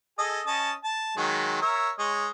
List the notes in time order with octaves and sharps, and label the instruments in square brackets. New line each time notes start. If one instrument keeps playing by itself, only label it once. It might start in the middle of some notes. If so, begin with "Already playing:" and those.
[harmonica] G#4 A4 D#5
C#4 D#5 A5
A5
D#3 F#3 G#3
A#4 C#5 E5
G#3 C#5 D#5